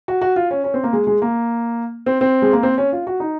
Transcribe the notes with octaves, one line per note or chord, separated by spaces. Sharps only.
F#4
F#4
F4
C#4
C#4
C4
A#3
G#3
G#3
A#3
C4
C4
G#3
A#3
C4
C#4
F4
F#4
D#4